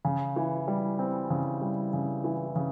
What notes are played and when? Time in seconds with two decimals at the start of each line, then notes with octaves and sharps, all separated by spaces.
0.05 C#3
0.36 E3
0.68 G3
0.99 C4
1.30 C#3
1.62 G3
1.93 C#3
2.24 E3
2.55 C#3